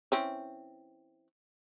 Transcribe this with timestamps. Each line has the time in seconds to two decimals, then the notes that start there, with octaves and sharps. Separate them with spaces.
0.12 E3 C4 C#4